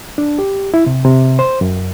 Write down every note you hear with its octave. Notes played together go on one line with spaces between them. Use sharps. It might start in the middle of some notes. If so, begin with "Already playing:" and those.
D4
G4
E4
C3
C3
C5
F#2